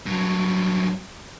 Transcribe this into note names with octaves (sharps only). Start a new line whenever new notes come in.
G2 F#3